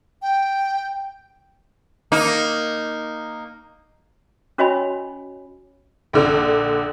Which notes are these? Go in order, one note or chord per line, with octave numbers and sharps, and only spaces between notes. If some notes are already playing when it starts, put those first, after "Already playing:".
G5
A#3 D#4
C#4 F#4 C#5 D#5 G#5 B5
A#1 D3